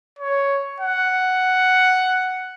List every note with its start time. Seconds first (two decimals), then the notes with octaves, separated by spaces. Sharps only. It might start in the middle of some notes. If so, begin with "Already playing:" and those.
0.19 C#5
0.80 F#5